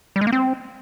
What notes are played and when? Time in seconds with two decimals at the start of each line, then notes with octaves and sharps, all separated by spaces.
0.16 G3
0.21 G#3
0.27 A#3
0.32 C4